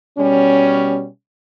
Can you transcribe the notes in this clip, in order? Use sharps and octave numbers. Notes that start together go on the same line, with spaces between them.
B2 G3 C#4